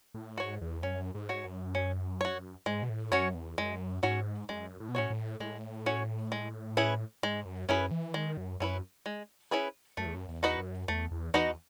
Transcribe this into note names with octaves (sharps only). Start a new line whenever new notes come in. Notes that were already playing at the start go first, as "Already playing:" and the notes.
A2
G#2 F#4 C#5
E2
F#2 C#4
G#2
F#4 C#5
F#2
C#4
F#4 C#5
G#2 G#3
B2
A2
F#2 C#4 F#4 C#5
E2
F#2 G#3
G#2 C#4 F#4 C#5
F#2 G#3
A2
B2
A2 C#4 F#4 C#5
A2
A2 G#3
C#4 F#4 C#5
G#3
C#4 E4 G#4 B4
G#2 G#3
F#2
F#2 C#4 E4 G#4 B4
E3
D#3 G#3
F#2
F#2 C#4 E4 G#4 B4
G#3
C#4 E4 G#4 B4
F#2 A3
E2
F#2
E2
D#4 F#4 B4 D#5
F#2
E2 A3
E2
E2 D#4 F#4 B4 D#5